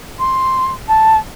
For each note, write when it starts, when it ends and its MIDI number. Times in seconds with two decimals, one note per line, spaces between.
0.19 0.71 84
0.88 1.17 81